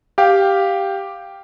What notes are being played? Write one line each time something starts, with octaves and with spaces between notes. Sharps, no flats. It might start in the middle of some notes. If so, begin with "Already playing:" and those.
G4 F5 G5